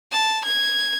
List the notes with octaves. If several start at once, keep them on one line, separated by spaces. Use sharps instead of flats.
A5
G#6